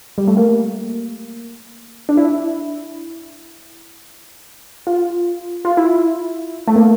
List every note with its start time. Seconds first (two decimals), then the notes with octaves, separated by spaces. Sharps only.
0.18 G3
0.27 A3
0.37 A#3
2.09 D4
2.17 E4
4.87 F4
5.65 F4
5.77 E4
6.68 A3
6.76 A#3